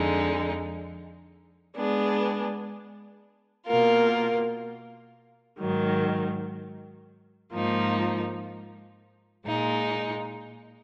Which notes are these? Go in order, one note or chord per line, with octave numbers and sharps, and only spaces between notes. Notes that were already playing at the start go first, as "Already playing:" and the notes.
Already playing: F2 D3 G#3 D#4
G#3 B3 D4 G#4
B2 A#3 F4 A#4
G#2 D#3 F#3
G#2 F3 A#3 D#4
A#2 G#3 D#4